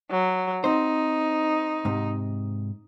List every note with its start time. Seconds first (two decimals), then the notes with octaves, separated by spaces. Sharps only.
0.10 F#3
0.64 C4 D#4 C5
1.85 G#2 C3